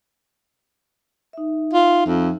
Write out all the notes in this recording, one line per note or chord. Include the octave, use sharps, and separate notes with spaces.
D#4 E5
F4
F2